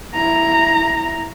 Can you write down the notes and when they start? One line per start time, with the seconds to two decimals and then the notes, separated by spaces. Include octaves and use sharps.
0.14 E4 A#5